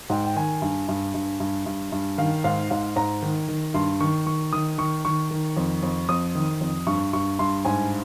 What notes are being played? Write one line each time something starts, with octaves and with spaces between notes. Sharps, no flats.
G#2 G5
G5
D#3 G#5
G2
G2
G2
G2
G2
G2
D#3 F5
G#2 F5
G#2 F5
G#2 A#5
D#3
D#3
G2 C6
D#3 C#6
D#3 C#6
D#3 D#6
D#3 C#6
D#3 C#6
D#3
F2
F2
F2 D#6
D#3
F2
G2 C#6
G2 C#6
G2 C6
G#2 G#5